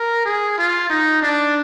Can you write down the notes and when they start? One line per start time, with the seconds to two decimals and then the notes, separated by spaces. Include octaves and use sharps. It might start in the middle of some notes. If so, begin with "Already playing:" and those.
Already playing: A#4
0.25 G#4
0.58 F4
0.90 D#4
1.22 D4